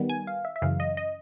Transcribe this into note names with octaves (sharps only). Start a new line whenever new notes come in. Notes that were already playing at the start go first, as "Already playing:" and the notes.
Already playing: D#3 G3 B3
G#5
F5
E5
E5
F#2 C#3 E3 F5
D#5
D#5